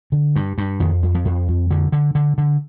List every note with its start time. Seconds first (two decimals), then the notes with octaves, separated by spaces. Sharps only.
0.12 D3
0.36 G2
0.58 G2
0.80 F2 D#3
1.03 F2
1.14 F3
1.25 F2
1.48 F2
1.71 D3
1.92 D3
2.15 D3
2.38 D3